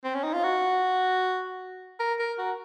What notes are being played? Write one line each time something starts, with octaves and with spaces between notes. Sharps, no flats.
C4
C#4
D#4
F4
F#4
A#4
A#4
F#4